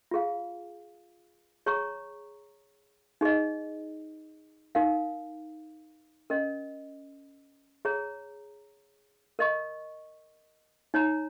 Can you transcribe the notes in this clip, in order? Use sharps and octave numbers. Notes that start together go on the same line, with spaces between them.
F4 G#4 F5
G#4 C#5 A#5 C#6
D#4 G#4 D#5
D#4 A#4 F5
C#4 A#4 D#5
G#4 C#5 A#5
A#4 D#5 C#6
D#4 C#5 A#5